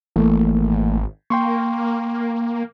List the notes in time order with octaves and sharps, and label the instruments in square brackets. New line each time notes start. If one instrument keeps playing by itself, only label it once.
[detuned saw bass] G#1 [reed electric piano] E3 A3 A#3
[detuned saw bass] A#3 [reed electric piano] G5 C6 C#6